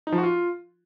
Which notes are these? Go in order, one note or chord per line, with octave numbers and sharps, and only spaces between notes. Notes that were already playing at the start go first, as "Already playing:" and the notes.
D#4
F3
F#4
F4